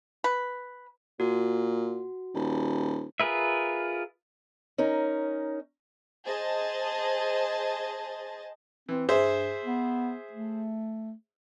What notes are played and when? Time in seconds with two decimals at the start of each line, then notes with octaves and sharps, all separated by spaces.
0.24 B4
1.20 A#2 F#4
2.34 D#1
3.20 F4 G#4 A#4 B4 E5
4.78 C#4 D#4 A#4
6.25 G#4 C5 D#5 A5
8.89 E3 C4
9.09 G2 G#4 C5 E5
9.63 B3
10.33 A3